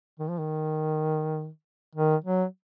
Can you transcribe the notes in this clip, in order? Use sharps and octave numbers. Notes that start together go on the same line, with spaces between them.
D#3
F3
D#3
D#3
F#3